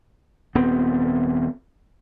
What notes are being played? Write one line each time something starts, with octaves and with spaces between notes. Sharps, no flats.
D#1 B3 C4